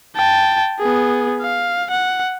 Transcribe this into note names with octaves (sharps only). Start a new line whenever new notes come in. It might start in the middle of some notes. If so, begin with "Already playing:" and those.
G5 A5
B3 G#4
F5
F#5